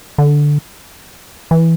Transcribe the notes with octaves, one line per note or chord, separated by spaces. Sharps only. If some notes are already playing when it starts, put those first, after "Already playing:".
D3
E3